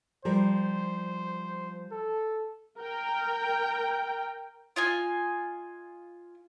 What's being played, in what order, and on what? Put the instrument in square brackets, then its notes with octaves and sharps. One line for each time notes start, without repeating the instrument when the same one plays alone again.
[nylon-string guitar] F3 G3 A#4 [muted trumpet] C5
[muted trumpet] A4
[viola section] A#4 G5
[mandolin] F4 D#5 G#5